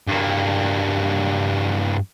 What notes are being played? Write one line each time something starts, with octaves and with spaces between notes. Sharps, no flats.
G2 A#3